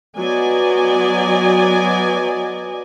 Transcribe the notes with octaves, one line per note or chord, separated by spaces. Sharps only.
F#3 B3 D5 D#5 G#5